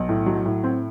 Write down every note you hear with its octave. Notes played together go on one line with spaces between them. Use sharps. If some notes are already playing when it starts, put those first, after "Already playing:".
Already playing: B1
A2
F#3
A2
C4